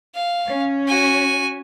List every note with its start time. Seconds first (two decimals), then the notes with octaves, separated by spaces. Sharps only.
0.15 F5
0.47 C#4
0.88 F#4 G#5